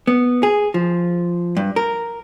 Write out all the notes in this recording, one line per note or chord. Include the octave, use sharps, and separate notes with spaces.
B3
G#4
F3
G2
A#4